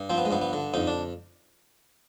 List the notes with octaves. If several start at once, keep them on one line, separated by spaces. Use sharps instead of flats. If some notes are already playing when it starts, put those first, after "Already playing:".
Already playing: G2
F3 C4
B3
G#3
G2 B3
B3
D3
F2 D#4
D4